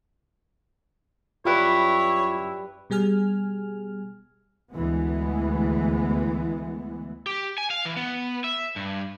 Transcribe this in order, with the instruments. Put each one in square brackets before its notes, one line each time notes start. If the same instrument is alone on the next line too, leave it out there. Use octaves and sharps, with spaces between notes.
[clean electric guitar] F#2 E4 [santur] G3 B4 [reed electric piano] F4 [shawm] C#5
[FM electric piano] B2 G3 G#4 G#5 F6
[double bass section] D2 E3 G#3 B3
[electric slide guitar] G4
G#5
F5
E3
B3
E5
G2